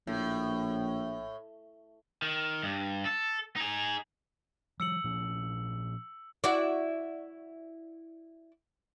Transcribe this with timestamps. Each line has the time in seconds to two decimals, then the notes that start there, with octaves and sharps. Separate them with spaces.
0.07 A#1 A2
2.22 D#3
2.63 G2
3.05 A4
3.56 D#4 G#4
4.80 F3 G3 E6 C#7 F#7
5.04 A#2 F3 C#4
6.44 E4 F#4 D5